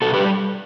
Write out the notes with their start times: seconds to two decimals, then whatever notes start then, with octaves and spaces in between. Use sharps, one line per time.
0.02 B2 F#4 A4
0.14 G4 B4
0.20 G3